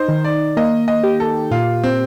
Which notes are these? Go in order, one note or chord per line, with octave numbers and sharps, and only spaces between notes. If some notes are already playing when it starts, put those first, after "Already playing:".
Already playing: D#4 C5
D#3
D5
A#3 D#5
D#5
G4
A4
A#2 F4
C4